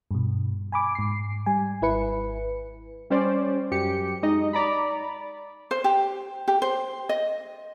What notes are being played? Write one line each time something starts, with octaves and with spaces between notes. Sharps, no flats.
G2 B2
G#5 B5 D6
G#2 C7
G3 G#5
G#1 E4 B4 C#7
G3 C#4 C5 D5
F#2 G4 C#7
G#3 D#4 D#5
D5 A#5 B5
C5
G4
G4
C5
D#5